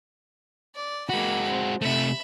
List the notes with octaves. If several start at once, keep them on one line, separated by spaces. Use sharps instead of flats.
D5
G#3 A#3 F#4 B5
C4
C3 A3 E5 B5